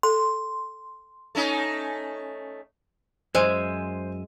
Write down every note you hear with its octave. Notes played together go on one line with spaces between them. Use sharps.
A4 C6
A3 C#4 D#4
F#2 G#3 C5 E5 G#5